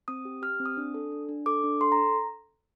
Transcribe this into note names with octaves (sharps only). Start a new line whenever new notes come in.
C4 D#6
G4
G4 F6
C4
D#6
D4
A4
D4
D4
A4 D6
D4
A4 C6
A#5